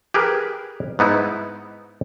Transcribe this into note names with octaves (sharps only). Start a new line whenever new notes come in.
G4 G#4 A#4 B4
G#2 B3 D#4 E4